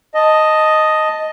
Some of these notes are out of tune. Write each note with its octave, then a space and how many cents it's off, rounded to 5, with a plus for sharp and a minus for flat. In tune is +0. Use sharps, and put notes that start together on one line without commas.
D#5 +0 A5 +0